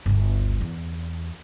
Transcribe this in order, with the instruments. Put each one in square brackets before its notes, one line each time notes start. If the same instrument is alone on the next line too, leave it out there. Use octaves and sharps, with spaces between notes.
[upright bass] G1 D2
E2